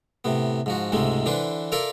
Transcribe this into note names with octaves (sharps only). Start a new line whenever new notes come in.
A2 C3 B3
G#2 F3 F#4
C#2 G#2 C3 G#3 A3
D3 E3 D4 B4 C5
F4 A4 A#4 D5 E5 F5